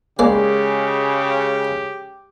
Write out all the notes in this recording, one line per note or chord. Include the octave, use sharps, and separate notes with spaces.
C#3 G#3 A#3 G4 D5